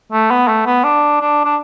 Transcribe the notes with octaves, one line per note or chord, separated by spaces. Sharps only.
A3
B3
A3
B3
D4
D4
D4